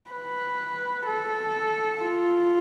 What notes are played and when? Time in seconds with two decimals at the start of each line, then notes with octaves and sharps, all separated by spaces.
0.11 B4
1.06 A4
2.01 F4